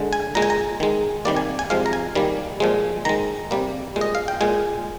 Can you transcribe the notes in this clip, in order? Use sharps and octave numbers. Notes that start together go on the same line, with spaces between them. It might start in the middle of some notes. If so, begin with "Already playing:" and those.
Already playing: D3 G#3
G#5
A#2 G#3 A#5
G#5
A#5
D#3 G#3
C3 D#3 G3 A#3 D5
G#5
G#5
C3 F3 G#3 F5
A#5
G#5
D#3 G3 A#3
A#2 F3 G#3
D#3 G#3 A#5
C3 G3 A#3
A#2 G#3
D#5
F5
G5
A#2 G#3 G#5